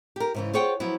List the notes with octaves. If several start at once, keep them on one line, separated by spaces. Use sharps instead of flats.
G4 A#4
G#2 C#3 E3
F4 G#4 C5 C#5 F#5 G5
F3 F#3 B3 E4